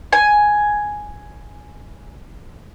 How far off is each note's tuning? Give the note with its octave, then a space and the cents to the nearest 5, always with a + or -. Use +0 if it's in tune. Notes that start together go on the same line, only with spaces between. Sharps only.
G#5 +5